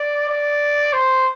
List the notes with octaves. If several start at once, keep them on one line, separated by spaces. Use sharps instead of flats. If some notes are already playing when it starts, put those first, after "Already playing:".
Already playing: D5
D5
C5